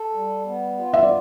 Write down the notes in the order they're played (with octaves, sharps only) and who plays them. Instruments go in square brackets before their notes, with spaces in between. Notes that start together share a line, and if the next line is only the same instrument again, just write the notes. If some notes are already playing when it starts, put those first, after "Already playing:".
Already playing: [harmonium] A4
G3
B3
F4
[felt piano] E5
D5